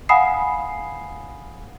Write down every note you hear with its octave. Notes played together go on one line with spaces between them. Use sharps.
F5 F#5 G#5 B5 D#6 C7